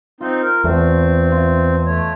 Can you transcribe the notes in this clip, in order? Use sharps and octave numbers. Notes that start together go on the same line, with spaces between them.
C4 D#4 F4
A#4
E2 A3 C4
F4 D#5 E5
A3 C#5